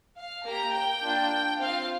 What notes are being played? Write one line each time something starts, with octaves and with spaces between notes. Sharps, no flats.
F5
A#3 G4 A#5
G5
A#3 D4 F4
C4 F4 F5